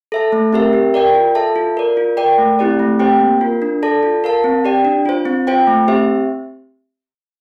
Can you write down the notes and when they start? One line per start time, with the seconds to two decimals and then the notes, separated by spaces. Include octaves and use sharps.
0.12 A4 E5 A5
0.32 A3
0.53 C4 G4 A#4 E5
0.73 G4
0.94 A#4 D5 G5
1.15 F4
1.35 A4 E5 A5
1.56 F4
1.77 A#4 D5
1.97 F4
2.17 A#4 D5 G5
2.38 A3
2.59 C4 E4 G4 D5
2.79 A3
2.99 C4 G4 C5 G5
3.20 A#3
3.41 F4 A#4
3.62 D4
3.83 A4 D5 A5
4.03 F4
4.24 A#4 F5 A5
4.44 C4
4.64 G4 D5 G5
4.85 D4
5.06 F4 C5
5.25 C4
5.47 F4 C5 G5
5.67 A3
5.88 C4 G4 C5 E5